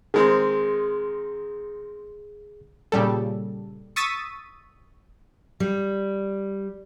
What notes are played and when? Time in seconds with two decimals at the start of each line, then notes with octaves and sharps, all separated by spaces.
0.14 D#3 G#3 C4 G#4
2.92 A#2 C#3 G3 A4
3.96 C#6 D#6 E6 A6 B6 D#7
5.60 G3